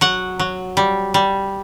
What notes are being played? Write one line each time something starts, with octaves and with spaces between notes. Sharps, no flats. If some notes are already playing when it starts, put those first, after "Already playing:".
F#3 F#5
F#3
G3
G3